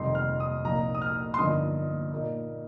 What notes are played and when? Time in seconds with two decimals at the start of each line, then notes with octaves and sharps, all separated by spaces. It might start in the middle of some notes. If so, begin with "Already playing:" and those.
Already playing: F1 F2 D#3 G3 D#4 C6
0.15 F6
0.40 D#6
0.64 C2 A#2 F3 D#4 A#5
0.95 D#6
1.02 F6
1.34 C6
1.38 G1 G2 F3 A#3 D#4 D#6
2.12 A#2 A#3 D#4